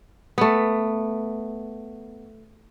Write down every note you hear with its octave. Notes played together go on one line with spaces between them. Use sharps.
A3 B3